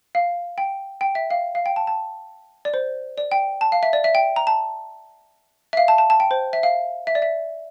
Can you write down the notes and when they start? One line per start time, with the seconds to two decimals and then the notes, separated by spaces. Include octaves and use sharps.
0.15 F5
0.58 G5
1.01 G5
1.15 E5
1.30 F5
1.55 F5
1.66 G5
1.76 A5
1.87 A5
2.65 D5
2.74 C5
3.18 D5
3.31 G5
3.61 A5
3.72 F5
3.83 E5
3.93 D5
4.04 E5
4.15 G5
4.36 A#5
4.47 A5
5.73 E5
5.77 F5
5.88 A5
5.98 A5
6.10 A5
6.20 G5
6.31 C5
6.53 E5
6.63 F5
7.07 E5
7.15 D5
7.22 E5